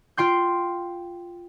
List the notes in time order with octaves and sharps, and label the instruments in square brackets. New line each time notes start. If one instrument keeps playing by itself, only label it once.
[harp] F4 G5 C6 G6